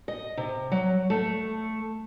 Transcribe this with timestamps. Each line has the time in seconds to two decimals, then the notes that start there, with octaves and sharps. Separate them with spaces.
0.08 D#5
0.37 C3
0.72 F#3
1.10 A3